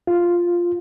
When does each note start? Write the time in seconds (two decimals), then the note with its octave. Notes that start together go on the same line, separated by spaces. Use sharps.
0.07 F4